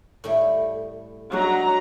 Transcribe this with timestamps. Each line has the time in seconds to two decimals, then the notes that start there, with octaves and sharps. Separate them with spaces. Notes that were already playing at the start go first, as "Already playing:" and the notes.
0.24 A2 G3 A3
1.32 F#3 D4 D#4 A#5